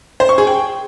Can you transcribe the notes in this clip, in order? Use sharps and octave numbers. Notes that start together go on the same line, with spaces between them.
C5
C#6
G#4
G5